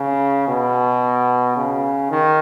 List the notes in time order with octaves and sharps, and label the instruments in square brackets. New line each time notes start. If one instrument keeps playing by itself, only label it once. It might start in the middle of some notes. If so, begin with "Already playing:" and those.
Already playing: [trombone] C#3
B2
C#3
D#3